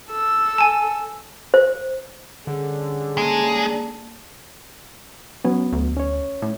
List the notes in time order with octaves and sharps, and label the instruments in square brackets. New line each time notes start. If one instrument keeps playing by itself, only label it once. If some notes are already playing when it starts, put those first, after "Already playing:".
[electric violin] A4 E6
[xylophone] G#5 A5
[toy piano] C5
[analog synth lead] D3 [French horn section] G3 C#4 G#4
[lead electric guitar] G#3 [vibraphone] A#3 A5
[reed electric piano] F#3 B3 [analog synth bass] C#4
[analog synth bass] D2
[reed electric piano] C#4 C#5
[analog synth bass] A2